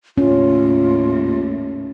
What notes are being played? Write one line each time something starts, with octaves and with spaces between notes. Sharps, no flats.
D#2 A2 C#4 F4